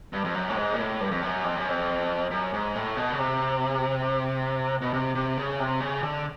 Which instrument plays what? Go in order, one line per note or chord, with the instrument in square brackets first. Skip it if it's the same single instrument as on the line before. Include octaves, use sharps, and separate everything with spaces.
[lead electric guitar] G2
F2
F#2
A2
G#2
A#2
A2
G2
F2
F#2
F2
F#2
F2
F#2
G#2
A2
B2
C#3
C3
B2
C3
C3
C#3
C3
C#3
D3